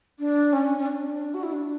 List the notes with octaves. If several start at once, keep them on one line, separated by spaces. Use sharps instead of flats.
D4
C#4
C#4
D4
F#4
E4
D4